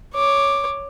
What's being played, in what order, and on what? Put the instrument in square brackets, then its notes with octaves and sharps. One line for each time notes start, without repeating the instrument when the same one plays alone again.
[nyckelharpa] C#5 D6